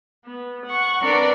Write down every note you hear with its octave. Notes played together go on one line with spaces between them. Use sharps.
B3
F#5 C#6
C4 D4 A#4 B4 D5